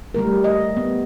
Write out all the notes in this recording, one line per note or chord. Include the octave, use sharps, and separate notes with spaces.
G3 A3 A#4
D#5
B3